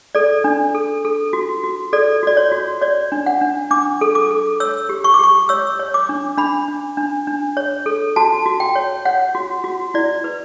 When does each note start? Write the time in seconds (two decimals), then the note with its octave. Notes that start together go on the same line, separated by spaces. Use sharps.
0.15 A4 D5
0.44 D4
0.75 A4
1.05 A4
1.33 F#4
1.64 F#4
1.93 A4 D5
2.23 F#4 D5
2.37 C#5
2.52 F#4
2.81 C#5 D5
3.12 D4
3.26 F#5
3.41 D4
3.71 D4 D6
4.01 A4
4.15 D6
4.31 A4
4.60 C#5 E6
4.89 G4
5.04 C#6
5.14 D6
5.19 G4 C#6
5.49 C#5 E6
5.79 C#5
5.94 D6
6.09 D4
6.38 D4 B5
6.68 D4
6.97 D4
7.27 D4
7.57 C#5
7.86 A4
8.16 F#4 A5
8.46 F#4
8.60 G5
8.75 C#5
9.05 C#5 F#5
9.35 F#4
9.64 F#4
9.94 E4 D5
10.24 B4